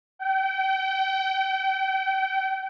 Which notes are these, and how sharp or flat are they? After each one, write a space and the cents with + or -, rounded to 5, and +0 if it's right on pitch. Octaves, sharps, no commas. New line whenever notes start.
G5 -35